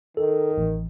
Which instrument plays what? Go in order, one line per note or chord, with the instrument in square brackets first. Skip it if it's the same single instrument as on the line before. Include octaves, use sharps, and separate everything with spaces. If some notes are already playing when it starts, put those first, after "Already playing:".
[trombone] D#3 [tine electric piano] A4
[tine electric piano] A1